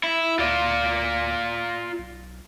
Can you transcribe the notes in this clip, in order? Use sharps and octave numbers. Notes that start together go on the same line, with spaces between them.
E4
D2 F4 D5
B1